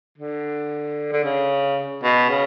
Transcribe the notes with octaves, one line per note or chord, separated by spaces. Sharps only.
D3
D3
C#3
B2
C#3